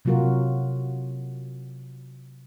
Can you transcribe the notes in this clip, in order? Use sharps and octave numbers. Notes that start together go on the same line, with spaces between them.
C3 F#3 A#3 F4 F#4 A#4